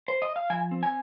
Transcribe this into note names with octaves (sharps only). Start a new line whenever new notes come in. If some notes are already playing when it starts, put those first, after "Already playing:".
C5
D#5
F5
F3 G#5
C4
G#5